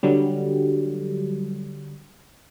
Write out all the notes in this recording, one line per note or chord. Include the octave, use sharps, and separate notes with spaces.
D3 F#3 G3